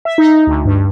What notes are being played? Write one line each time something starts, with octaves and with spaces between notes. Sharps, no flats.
E5
D#4
D2
G2